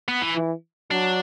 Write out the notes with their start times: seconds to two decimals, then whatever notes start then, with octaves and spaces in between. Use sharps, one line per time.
0.08 B3
0.22 E3
0.36 E3
0.91 F#3 D4